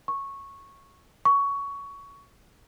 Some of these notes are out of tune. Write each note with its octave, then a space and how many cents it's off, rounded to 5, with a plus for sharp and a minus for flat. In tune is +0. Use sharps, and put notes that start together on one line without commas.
C#6 -10
C#6 +15